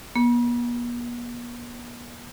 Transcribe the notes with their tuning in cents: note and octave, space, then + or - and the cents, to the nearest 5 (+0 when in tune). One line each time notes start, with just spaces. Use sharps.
B3 -45